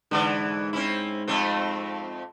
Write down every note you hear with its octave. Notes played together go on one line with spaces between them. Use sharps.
G#2 D3 E3 D5
C4 C#4 E4
F2 A3 C4